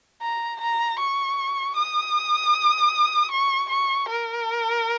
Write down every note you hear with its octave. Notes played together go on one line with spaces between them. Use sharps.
A#5
A#5
C#6
D#6
C#6
C#6
A#4